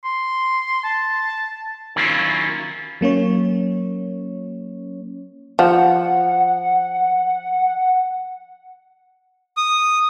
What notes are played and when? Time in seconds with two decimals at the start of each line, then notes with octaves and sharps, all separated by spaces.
0.05 C6
0.84 A5
1.96 D#3 F#3 A#3 C#4 E4 F4
3.01 F#3 A#3 C#4 C#5
5.59 F3 F#5
9.57 D#6